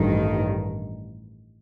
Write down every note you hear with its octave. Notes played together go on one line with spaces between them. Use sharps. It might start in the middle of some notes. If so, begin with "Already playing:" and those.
Already playing: A1 G2 D#3